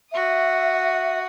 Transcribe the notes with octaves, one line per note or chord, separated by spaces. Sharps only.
F#4 E5 D#6